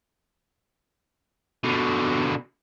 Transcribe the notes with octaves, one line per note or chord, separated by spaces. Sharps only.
B2 D3